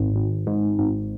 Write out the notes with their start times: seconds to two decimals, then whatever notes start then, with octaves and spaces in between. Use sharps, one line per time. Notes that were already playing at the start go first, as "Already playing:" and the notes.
Already playing: G#1
0.16 G#1
0.47 G#2
0.79 G#1